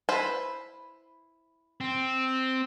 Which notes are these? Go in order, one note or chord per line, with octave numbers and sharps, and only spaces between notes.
E4 B4 C5
C4